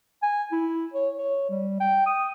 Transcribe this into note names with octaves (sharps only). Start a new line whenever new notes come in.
G#5
E4
C#5
C#5
G3
G5
D#6